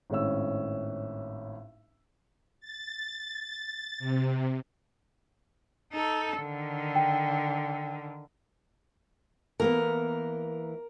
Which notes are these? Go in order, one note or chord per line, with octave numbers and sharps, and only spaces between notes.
G#1 A2 C#4 E6
A6
C3
D#4 A4
D3 D#3
G5
E3 A#3 B3 A#4